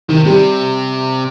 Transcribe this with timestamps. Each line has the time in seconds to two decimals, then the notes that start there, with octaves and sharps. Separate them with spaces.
0.09 C3 D#3
0.25 C3 G3